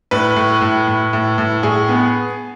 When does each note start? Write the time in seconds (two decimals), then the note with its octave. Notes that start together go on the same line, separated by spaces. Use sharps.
0.11 A2 B4
0.36 A2
0.61 A2
0.87 A2
1.13 A2
1.38 A2
1.63 A2 G#4
1.89 B3